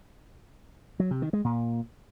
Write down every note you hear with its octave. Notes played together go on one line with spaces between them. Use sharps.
F#3
C3
D#3
G#3
A#2